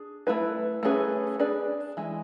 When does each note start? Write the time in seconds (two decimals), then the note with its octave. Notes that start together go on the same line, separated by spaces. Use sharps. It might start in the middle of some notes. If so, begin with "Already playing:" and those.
Already playing: D4 G#4
0.27 A3 E4 B4
0.83 A3 C#4 G#4 B4
1.40 D4 G#4 B4 D5
1.97 E3 G#3